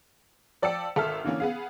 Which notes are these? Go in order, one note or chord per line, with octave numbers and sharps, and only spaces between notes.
F3 D5 G5 A5 E6 C#7
G#1 A4 E5 F6
D3 E3 A#3 C#4 D4
B3 G#4 F5